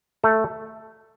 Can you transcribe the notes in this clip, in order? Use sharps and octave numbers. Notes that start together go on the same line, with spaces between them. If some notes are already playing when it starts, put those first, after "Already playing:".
A3 A4